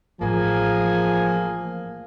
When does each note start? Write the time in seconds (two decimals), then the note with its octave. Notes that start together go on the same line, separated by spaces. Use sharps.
0.21 A1 A2 F3 A#3 G#4 A#4 G#5